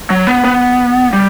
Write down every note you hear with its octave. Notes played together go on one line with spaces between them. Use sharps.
F#3
B3
B3
G3